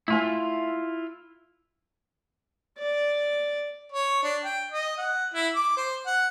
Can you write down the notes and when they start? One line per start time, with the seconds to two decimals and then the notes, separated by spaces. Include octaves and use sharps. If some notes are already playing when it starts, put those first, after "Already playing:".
0.08 A3 E4 F4 G#5
2.79 D5
3.92 C#5
4.23 D4
4.45 G5
4.72 D#5
4.98 F#5
5.34 E4
5.55 D6
5.77 C5
6.06 F#5